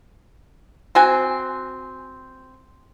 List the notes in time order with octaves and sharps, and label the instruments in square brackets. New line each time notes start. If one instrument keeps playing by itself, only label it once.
[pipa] C4 F#4 G#5